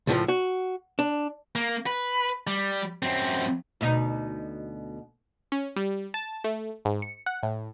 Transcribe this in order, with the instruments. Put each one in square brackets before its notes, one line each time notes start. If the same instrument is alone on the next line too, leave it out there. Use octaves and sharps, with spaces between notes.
[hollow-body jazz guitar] C#2 A2 D#3 F3
F#4
D4
[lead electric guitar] A#3
B4
G3
F#2 C4
[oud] D2 B2 D#4
[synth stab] C#4
G3
A5
A3
G#2
C#7
F#5
A2